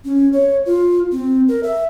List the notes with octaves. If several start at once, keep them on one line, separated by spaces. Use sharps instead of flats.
C#4
C#5
F4
C4
A#4
E5